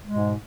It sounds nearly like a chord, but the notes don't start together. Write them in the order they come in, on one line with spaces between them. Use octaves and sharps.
G#3 B2 G#2